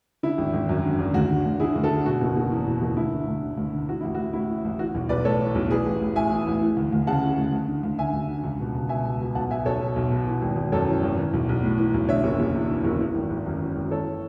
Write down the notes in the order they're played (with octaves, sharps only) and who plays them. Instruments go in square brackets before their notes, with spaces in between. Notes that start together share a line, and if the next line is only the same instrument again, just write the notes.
[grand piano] D3 E4
G#1
G#1
F#2
D3
G#1
D2 F#4
D3
D2
D3 E4 G#4
D2
F#4 A4
D3
B2 F#4
F#1
F#1
E2
B2
F#1
D2 E4
D3
D2
D3
D2
D3
E3 F#4
A1 E4
F#4
A1
A2 E4
E3
A1
E3 F#4
B1
B1 B4 D5
A2 A4 C#5
E3
B1
E3 G#4 B4
A1
A1
A2 E5 G#5
E3
A1
E3
D2
D2
C#3 F#5 A5
E3
D2
D2
D3
D2
D3 E5 G#5
D2
D3
C#2
B2
C#2
B2 E5 G#5
C#2
B2
B1 F#5 A5
B2 E5 G#5
B1 A4 C#5
B2
B1
B2
E3
G#1
G#1
F#2 A4 C#5
E3
G#1
E3
B1
B1
A2
E3
B1
D3 C#5 E5
F#1
F#1
E2
D3
F#1
E3
G#1
G#1
F#2
E3
G#1
E3 A4 C#5